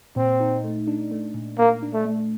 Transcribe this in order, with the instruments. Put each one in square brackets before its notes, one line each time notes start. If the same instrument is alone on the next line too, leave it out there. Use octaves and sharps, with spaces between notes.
[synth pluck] A#2 [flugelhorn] C4
[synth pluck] D#4
A3
D4
A3
A#2
[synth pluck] A#2 [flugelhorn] A#3
[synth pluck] D4
[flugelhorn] A3
[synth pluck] A3